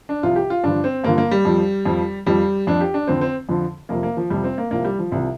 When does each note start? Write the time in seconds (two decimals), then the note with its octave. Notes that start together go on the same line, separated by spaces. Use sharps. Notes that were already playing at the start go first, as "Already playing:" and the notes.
0.09 D4
0.23 C2 C3 F3 F4
0.36 G4
0.50 F4
0.64 G2 D3 F3 D4
0.84 C4
1.04 G2 D3 F3 A#3
1.18 A#3
1.31 G3
1.45 F2 F3
1.85 F2 F3
2.26 F2 F3 G3
2.67 F2 F3 D4
2.80 G4
2.94 D4
3.07 F2 D3 F3 C4
3.21 C4
3.49 F2 D3 F3
3.89 F2 C3 F3 A#3
4.03 A#3
4.17 F3
4.30 F2 C3 F3 G3
4.44 C4
4.58 A#3
4.71 C2 C3 F3 A#3
4.84 G3
4.99 F3
5.12 C2 C3 F3